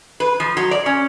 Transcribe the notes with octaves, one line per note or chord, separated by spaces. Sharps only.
B4
F3
F#3
D5
C#4